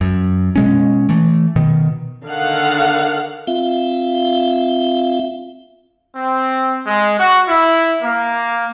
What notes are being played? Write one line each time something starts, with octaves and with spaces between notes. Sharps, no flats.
F#2
B2 G#3 C#4
E3 A3
B2 D#3
D3 D#3 F5 F#5
C4 F4 E5 F5
C4
G#3
F#4
E4
A#3